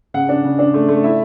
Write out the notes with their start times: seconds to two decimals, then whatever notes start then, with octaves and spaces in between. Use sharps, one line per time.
0.14 C#3 F#5
0.29 D4
0.44 C#3
0.59 D4
0.74 A3
0.88 A3
1.04 E4 E5